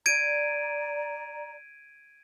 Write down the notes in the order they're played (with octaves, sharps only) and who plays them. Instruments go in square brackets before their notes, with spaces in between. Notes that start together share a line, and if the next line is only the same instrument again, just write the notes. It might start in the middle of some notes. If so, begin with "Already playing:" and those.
[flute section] D5 A#5 [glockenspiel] G#6 D7 D#7